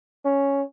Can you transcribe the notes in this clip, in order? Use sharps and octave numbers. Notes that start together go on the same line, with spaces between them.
C#4